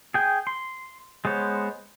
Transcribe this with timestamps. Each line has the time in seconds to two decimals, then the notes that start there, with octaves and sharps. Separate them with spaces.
0.14 G#4 G5 G#5
0.47 C6
1.25 G#3 B3 C5 C#5